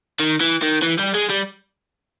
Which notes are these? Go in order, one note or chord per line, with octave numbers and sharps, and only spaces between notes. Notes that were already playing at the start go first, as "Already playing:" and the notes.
D#3
E3
D#3
E3
G3
G#3
G3